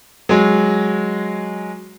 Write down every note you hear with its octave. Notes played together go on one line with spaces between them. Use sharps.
F#3 G#3